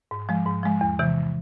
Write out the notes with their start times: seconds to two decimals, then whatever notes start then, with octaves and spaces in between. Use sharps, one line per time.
0.11 G#2
0.29 F3 G#3
0.46 G#2
0.63 F3 G#3
0.81 E2
0.99 C3 E3